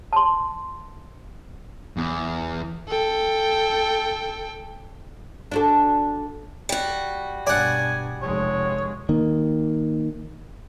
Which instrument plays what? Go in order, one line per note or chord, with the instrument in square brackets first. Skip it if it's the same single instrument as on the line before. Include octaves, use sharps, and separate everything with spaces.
[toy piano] A5 C6
[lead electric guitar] E2
[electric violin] A4 G5
[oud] D4 F#4 A4
[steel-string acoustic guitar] G3 F#4
[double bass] G2 B2 [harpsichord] D5 F#5 [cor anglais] G#5
[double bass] F1 G#3 [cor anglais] C#5
[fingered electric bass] D#3 A#3